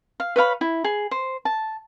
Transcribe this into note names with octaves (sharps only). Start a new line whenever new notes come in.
F5
B4 C#5 F5 B5
E4
G#4
C5
A5